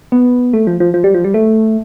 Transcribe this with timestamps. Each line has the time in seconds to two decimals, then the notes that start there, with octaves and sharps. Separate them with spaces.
0.12 B3
0.53 A3
0.67 F3
0.80 F3
0.94 F3
1.04 G3
1.14 F3
1.25 G3
1.34 A3